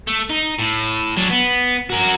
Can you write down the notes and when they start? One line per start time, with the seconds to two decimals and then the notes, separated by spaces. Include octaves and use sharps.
0.07 A3
0.30 D#4
0.59 A2
1.17 F#3 D4
1.30 B3
1.90 F#4 A#4